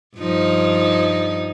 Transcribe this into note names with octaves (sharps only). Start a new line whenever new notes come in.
G2 F3 D#4